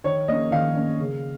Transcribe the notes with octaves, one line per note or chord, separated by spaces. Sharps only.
D#3 C#5
A#3 C#4 D#5
D#3 F5
A#3 C#4
C#3